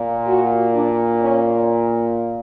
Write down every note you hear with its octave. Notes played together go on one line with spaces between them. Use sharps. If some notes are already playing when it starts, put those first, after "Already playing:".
Already playing: A#2
F#4
D4
C#4